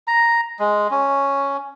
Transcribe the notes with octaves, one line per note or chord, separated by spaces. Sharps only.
A#5
G#3
C#4